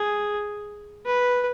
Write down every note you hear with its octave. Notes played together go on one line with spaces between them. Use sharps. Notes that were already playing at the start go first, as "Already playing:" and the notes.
Already playing: G#4
B4